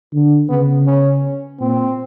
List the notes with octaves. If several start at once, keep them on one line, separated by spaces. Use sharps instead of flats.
D3
C#3 B3
C#4
A#2 C4